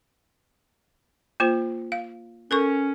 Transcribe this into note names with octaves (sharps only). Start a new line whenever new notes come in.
A#3 F4 C5
F5
C#4 A4 A#4 C#6